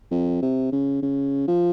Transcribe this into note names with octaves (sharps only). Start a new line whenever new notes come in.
F2
C3
C#3
C#3
F3